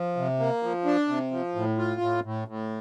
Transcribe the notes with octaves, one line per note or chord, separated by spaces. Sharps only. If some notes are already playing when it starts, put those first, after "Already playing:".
Already playing: F3
C3
A#3
F3
D4
C3
F3
A2
F4
A2
A2
A2